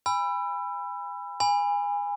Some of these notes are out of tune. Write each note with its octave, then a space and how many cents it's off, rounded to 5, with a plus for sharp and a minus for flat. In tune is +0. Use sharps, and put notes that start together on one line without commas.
G#5 -35 B5 +0 E6 +30
G#5 -25 B5 +0